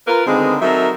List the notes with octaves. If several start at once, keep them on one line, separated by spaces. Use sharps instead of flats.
F4 A#4 B4
D3 D#3 G#3 B3 C4
F#3 C4 D#4 A4 A#4 E5